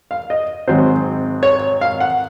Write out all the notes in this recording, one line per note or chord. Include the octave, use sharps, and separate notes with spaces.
F5
D#5
G#1 G#2 F#3 C4 C5
C#5
F5
F#5